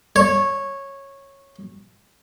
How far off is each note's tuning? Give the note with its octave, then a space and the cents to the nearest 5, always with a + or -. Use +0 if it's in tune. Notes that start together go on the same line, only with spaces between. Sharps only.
C#5 -10